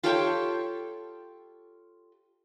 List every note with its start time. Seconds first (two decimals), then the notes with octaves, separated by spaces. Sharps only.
0.03 F4 G4 A4 C#5 F#5 G5